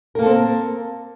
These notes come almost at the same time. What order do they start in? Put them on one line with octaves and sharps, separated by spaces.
A#4 A#3 A4 C4